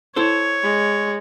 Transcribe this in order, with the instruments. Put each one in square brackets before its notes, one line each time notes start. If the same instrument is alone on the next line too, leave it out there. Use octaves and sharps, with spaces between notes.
[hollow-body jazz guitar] E4 A4 C5 [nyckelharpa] C#5
[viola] G#3